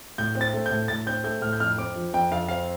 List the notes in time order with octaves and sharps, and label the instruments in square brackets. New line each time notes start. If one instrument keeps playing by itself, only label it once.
[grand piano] A2 G6
C4
A6
A3
G6
A2
A2 A6
C4 G6
A3 G6
A2 F6
G6
F2 F6
C4 D6
F3
F2 G5
F2 F5
C4 F5